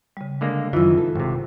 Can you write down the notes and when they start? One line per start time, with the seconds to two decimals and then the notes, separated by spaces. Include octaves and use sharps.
0.17 C#3 G3
0.41 D3 G#3 A#3
0.73 F#2 D#3 E3 F4 E6
0.97 A4
1.15 G#1 C3